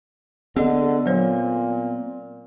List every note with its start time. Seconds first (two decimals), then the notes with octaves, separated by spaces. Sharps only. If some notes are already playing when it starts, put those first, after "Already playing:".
0.56 D3 B3 C4 G#4 D#5
1.06 A#2 F#3 C5 C#5